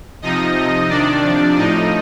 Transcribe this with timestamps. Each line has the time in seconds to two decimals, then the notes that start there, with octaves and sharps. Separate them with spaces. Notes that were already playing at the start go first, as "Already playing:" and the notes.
0.22 C3 F3 D#4 D#5
0.56 C3 F3
0.89 C3 D#3 D4 D5
1.23 C3 F3
1.56 A2 F3 D#4 D#5